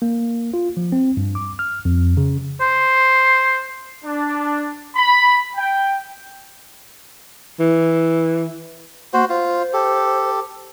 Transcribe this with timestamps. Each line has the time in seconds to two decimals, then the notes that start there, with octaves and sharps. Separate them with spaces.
0.02 A#3
0.54 F4
0.77 F3
0.92 C4
1.17 G2
1.35 D6
1.59 F6
1.85 F2
2.17 C#3
2.61 C5
4.04 D4
4.96 B5
5.57 G5
7.60 E3
9.13 A#3 F#4 C5
9.29 F4 C5
9.73 G4 A4